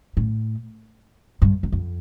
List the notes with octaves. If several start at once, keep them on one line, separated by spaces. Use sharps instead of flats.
A2
G2
E2
F2